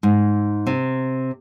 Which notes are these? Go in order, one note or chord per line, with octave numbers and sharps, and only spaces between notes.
G#2
C3